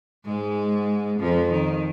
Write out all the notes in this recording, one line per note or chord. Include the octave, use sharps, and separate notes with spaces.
G#2 G#3
F2 F3
D#3